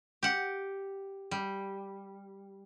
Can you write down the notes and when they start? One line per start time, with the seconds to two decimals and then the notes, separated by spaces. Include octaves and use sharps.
0.23 G4 F#5
1.31 G3